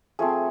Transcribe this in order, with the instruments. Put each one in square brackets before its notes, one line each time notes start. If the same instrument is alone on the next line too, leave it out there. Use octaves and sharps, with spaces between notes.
[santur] F3 A3 C4 G#4